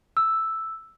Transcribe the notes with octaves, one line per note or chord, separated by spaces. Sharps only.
E6